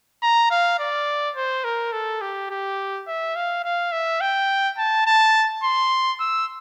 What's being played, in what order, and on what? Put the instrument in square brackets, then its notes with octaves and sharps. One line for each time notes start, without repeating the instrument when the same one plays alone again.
[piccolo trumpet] A#5
F5
D5
C5
A#4
A4
G4
G4
E5
F5
F5
E5
G5
A5
A5
C6
E6